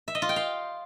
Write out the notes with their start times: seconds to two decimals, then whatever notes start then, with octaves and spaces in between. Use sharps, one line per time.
0.08 E5
0.15 D#5
0.22 F4
0.29 G5
0.36 F5